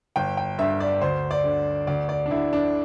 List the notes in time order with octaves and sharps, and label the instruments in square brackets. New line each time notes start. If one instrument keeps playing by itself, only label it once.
[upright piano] G1 G5
G5
G2 D3 E5
D5
D2 C5
D5
D3
D2 D5
D5
D4
D3 E4
D4